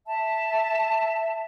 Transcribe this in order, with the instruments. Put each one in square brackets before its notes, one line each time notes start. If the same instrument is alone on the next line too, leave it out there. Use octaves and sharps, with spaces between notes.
[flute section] E5 A5